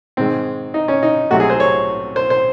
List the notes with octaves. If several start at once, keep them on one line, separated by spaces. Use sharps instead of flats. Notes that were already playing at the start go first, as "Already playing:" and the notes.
G#2 D#3 G#3 C4
D#4
C#4
D#4
C2 C3 F#3 A3 F#4
G#4
C5
C#5
C5
C5